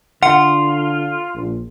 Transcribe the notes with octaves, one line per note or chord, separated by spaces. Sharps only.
D3 F4 F#5
A#1